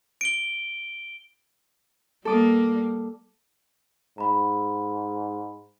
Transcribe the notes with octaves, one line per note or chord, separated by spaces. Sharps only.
D7 G7
G3 A#3 A4 D6 D#6
G#2 A#5 B5